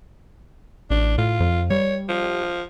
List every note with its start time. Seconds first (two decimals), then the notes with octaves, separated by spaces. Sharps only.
0.91 A1 D4
1.18 A2 F4
1.40 F2
1.71 G3 C#5
2.09 F3